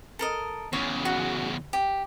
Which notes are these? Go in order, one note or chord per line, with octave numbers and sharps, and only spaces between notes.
A4 A#4 D#5
E2 C#3 C#5
F#4
G4